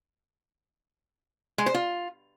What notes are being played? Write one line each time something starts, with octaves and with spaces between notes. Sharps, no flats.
G#3
C5
F4